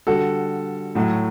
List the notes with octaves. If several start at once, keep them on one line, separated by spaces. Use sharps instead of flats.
D3 G3 F#4 A4
A2 F#3 A3